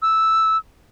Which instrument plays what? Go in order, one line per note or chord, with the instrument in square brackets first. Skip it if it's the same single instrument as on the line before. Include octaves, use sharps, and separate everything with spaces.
[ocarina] E6